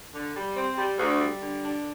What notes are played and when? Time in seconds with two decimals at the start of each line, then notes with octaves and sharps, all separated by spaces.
0.14 D3
0.36 G3
0.56 C4
0.77 G3
0.99 D2
1.20 G3
1.41 D3
1.63 D4